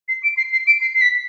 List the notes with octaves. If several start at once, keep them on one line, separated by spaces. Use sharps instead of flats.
C7
D7
C7
C7
D7
C7
C7
B6